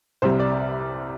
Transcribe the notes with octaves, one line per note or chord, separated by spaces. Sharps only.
C2 C3 G3 C5
D5